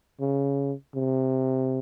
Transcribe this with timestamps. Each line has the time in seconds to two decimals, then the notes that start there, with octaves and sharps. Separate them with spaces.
0.20 C#3
0.95 C3